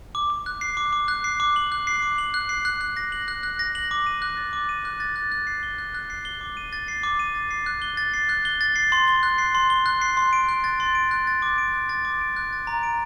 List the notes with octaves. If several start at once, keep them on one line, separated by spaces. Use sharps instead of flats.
D6
D6
F#6
C7
D6
D6
F#6
C7
D6
F#7
F#6
C7
D6
F#7
F#6
C7
F#6
F#6
A#6
F#7
F#6
F#6
A#6
F#7
D6
D#7
F#6
A6
D6
D#7
F#6
A6
F#6
F#6
C7
G7
F#6
F#6
C7
G7
D6
D#7
A6
C7
D6
D#7
A6
C7
F#6
G7
A6
C7
F#6
G7
A6
C7
C6
G7
F#6
C7
C6
G7
F#6
C7
C6
D7
F#6
A6
C6
D7
F#6
A6
D6
D7
F#6
A6
D6
D7
F#6
A6
A#5
D7